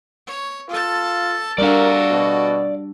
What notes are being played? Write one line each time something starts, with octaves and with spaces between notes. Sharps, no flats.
C#5
F4 A4 A5
G3 D4 F#4 A4 A#4 D5 F5
B2